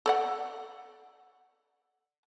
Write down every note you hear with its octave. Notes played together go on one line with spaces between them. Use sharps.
A4 D5 F#5